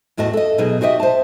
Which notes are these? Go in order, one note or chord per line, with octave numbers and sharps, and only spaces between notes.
E2 A2 F#4 D#5 A5
A4 D#5
B2 F#3 D#4 G#4
F#4 G4 C5 D#5 E5
C5 A5